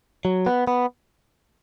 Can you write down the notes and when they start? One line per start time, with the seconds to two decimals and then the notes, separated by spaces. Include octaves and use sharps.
0.25 F#3
0.46 B3
0.67 B3